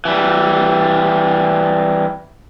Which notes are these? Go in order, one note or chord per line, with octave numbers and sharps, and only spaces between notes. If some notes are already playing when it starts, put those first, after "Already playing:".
E3 G3